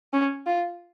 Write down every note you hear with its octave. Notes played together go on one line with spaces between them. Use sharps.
C#4
F4